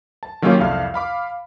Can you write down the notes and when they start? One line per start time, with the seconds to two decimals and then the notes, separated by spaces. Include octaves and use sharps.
0.23 A5
0.42 D#3 F#3 A#3 C#4 F4 G4
0.60 C2 F2 F5
0.94 F5 B5 D6